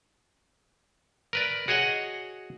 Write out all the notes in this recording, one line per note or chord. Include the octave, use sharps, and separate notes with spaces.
A#4 B4 D5
F#4 G#4 C#5 D#5 F#5